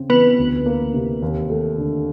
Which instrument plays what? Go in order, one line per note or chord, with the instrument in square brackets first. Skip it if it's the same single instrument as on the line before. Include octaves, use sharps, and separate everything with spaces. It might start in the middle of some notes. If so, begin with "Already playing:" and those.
Already playing: [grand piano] C#3 C4
[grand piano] E3 [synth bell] B3 B4
[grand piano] D2
A#3
C3
D#2
A3
D3